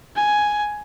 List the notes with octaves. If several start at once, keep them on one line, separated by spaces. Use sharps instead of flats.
G#5